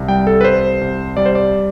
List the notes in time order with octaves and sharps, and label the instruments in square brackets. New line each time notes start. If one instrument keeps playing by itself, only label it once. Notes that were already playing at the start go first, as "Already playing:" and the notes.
Already playing: [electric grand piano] C2
G3 G5
A4
B4
C2 C5
C2
G3 D5
C5
D5